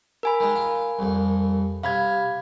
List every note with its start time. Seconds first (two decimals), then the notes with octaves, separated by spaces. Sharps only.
0.23 A#4 G#5 B5
0.40 D#3 G#3
0.55 F4
0.99 C2 F2
1.84 C3 F5 B5 G#6